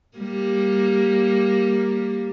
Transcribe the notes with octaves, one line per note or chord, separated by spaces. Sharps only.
G3 A#3